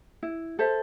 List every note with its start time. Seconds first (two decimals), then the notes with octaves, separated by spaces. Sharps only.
0.23 E4
0.59 A4 C5 E5